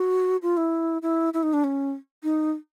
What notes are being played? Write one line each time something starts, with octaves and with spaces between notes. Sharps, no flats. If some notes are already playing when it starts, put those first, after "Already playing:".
Already playing: F#4
F4
E4
E4
E4
D#4
D4
C#4
D#4